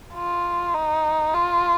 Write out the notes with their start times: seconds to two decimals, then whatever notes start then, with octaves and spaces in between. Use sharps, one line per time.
0.15 F4
0.75 D#4
1.34 F4